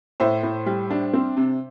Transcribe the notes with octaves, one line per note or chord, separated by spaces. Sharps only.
A2 C5 E5
A2
G3
D4
C4
C3